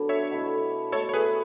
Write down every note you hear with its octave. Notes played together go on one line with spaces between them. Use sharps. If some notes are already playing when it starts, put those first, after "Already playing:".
Already playing: D3 F#3 B3 D4
C#5 E5
B2 A3 E4
B2 A3 E4 A4 C#5
C#5
G#4 B4